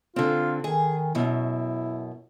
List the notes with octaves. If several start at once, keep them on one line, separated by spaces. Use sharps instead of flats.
D3 C4 F4
D#3 G#4
F#2 B2 E4